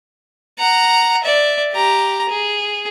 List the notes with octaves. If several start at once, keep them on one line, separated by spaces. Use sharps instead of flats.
F#5 A#5
D5 E5
G4 A#5
G#4